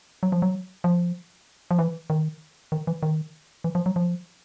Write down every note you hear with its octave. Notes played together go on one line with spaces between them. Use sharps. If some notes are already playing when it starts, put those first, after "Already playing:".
F#3
F3
F#3
F3
F3
E3
D#3
D#3
E3
D#3
E3
F3
F#3
F3